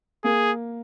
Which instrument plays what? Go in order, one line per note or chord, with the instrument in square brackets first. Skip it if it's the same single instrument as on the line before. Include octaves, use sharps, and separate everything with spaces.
[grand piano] A#3 [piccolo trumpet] G#4